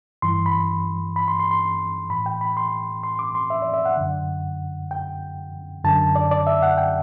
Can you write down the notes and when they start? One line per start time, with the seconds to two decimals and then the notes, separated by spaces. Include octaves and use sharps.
0.22 G2 E3 C6
0.46 B5
1.16 B5
1.28 C6
1.40 C6
1.51 C6
2.10 A2 E3 B5
2.26 G5
2.41 B5
2.57 C6
3.03 C6
3.19 D6
3.35 C6
3.50 E5
3.62 D5
3.74 E5
3.85 F#5
3.97 F#2 D3
4.91 G5
5.84 F#2 D3 A5
6.16 D5
6.31 D5
6.47 E5
6.63 F#5
6.78 G5